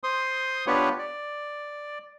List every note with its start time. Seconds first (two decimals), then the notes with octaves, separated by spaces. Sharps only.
0.04 C5 C6 D#6
0.67 B3 D4 F4 G4 B4 C#5
0.99 D5